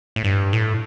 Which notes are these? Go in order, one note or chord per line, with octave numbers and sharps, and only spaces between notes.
A2
G2
A2